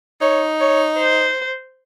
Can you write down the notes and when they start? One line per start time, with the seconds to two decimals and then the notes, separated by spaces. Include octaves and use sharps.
0.21 D#4 C#5
0.60 C#5
0.98 C5